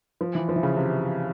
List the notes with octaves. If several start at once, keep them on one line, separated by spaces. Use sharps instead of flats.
F3
E3
F3
E3
C#3
C3